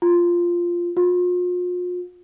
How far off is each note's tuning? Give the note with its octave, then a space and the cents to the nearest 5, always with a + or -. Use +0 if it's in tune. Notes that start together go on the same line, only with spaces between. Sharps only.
F4 -5
F4 +40